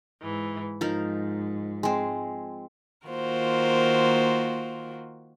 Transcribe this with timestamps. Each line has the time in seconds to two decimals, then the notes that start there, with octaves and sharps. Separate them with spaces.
0.21 G#2 E3
0.81 G#2 F3 D#4 A#4
1.83 G#3 C4
3.06 D#3 A#3 F4 F#4 A#4 C5